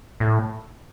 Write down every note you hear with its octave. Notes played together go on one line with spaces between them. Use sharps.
A2